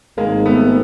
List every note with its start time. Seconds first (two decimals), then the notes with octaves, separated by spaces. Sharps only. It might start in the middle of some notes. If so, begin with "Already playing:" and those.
0.18 G#1 G#2 D#3 G#3 A#3
0.46 A3 B3